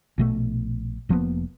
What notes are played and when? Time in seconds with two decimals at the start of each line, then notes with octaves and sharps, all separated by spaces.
0.18 A#1 B2 A3
1.09 F1 F3 A#3 B3